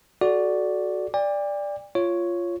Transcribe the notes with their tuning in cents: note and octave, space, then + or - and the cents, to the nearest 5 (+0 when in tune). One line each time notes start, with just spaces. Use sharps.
F#4 +0 A4 -30 D5 -5
D5 +0 G5 +40
F4 -10 C#5 +0